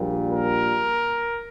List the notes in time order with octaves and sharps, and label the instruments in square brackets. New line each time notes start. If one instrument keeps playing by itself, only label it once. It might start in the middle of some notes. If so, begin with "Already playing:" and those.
Already playing: [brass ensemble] A#1 A#2 G3
A#4